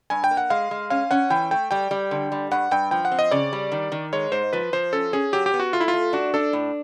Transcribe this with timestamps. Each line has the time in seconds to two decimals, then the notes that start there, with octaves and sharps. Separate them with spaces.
0.10 G2 G#5
0.24 G5
0.31 A#3
0.37 F#5
0.50 G#3 F5
0.71 G#3
0.90 C#4 F5
1.11 C#4 F#5
1.30 E3 G5
1.51 A3 G5
1.71 G3 G5
1.91 G3
2.11 D3
2.32 G3
2.51 G2 F#5
2.71 G2 G5
2.91 F3 G5
3.05 F#5
3.12 C4
3.19 D#5
3.31 C#3 D5
3.53 G3
3.72 D#3
3.92 D#3
4.13 G#3 C#5
4.32 G#2 C5
4.53 F3 B4
4.73 F3 C5
4.92 C#4 A4
5.13 C#4 G#4
5.33 F#3 G4
5.46 G4
5.54 B3
5.60 F#4
5.73 A3 F4
5.80 E4
5.88 F4
5.93 A3
6.13 D4 F#4
6.34 D4 A4
6.53 A2